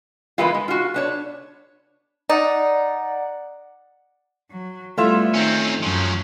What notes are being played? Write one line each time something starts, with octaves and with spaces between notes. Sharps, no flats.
E3 G#3 A#3 B3 E4 F4
G#3
F4 F#4
B3 D4 C#5
D#4 D5 F#5
F#3
G3 A3 B3 E4 F4 E5
D#3 C4 C#4
F#2 F3 F#3 C#4